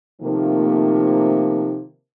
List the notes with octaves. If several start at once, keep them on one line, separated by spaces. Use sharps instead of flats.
C3 D#3 F3 A3 A#3